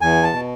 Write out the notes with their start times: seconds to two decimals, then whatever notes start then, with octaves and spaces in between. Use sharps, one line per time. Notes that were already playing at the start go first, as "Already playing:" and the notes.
0.01 E2 G#5
0.24 A5
0.33 B2